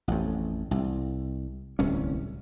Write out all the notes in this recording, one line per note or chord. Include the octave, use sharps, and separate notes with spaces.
A1 F2
C2
D1 C2 C#4